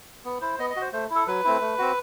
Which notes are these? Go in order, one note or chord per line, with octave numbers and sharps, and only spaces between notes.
B3
E4 C5
B3 D#5
D#5
F#4
C5
A3 C5
E4
A4
F#3 B4
A3 C4 E4
A3
C4 F#4